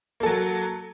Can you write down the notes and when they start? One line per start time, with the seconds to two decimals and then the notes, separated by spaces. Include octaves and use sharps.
0.20 A#3
0.23 A4
0.26 F#3